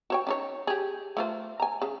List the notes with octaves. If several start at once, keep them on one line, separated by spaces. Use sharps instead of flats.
F#4 C#5 G5
C#4 D#4 C#5
G4 G#4
A3 F4 C5
G#5 A#5
C#3 G#4